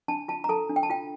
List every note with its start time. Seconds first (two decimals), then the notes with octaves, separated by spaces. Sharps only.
0.08 D4 A5
0.28 F4 A5
0.44 A#5
0.49 A4 A5
0.70 D4
0.76 G5
0.83 A5
0.90 F4 G5